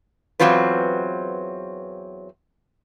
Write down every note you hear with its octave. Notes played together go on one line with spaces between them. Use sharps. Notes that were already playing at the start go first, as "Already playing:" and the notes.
E2 B2 F#3 C4 F4 B4